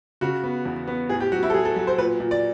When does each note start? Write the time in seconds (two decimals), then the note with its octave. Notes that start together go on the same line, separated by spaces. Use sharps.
0.21 C#3 F#4
0.44 B3
0.65 E2
0.87 B3
1.09 A2 G#4
1.20 G4
1.32 F#3 F#4
1.43 E4
1.50 A4
1.54 F#3 G#4
1.65 A4
1.76 F#3
1.87 C5
1.98 A#2 B4
2.20 A#2
2.31 D5